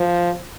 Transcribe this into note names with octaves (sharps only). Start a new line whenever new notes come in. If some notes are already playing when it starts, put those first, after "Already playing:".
Already playing: F3